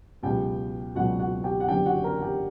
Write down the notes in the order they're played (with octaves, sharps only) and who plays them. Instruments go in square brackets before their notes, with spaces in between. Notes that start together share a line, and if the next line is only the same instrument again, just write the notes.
[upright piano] C#2 B2 F#3 G4 G5
C#2 B2 F#3 F#4 F#5
F#4 F#5
G4 G5
F#5
F#1 E2 D3 G4 G5
F#4 F#5
A#4 A#5
G4 G5